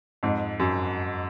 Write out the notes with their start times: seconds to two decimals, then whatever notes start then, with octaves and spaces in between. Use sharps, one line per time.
0.23 F2 G#2
0.60 F#2